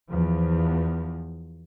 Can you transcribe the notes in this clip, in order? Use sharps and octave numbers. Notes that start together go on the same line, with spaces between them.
E2 F3